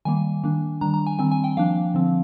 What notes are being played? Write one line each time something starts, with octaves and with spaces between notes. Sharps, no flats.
D#3 G3 A#3 G#5
D#3 A#3 D4
D#3 G3 D4 A#5
A#5
G#5
D#3 G3 C4 G#5
G#5
G5
F3 A#3 D4 F5
D3 F3 C4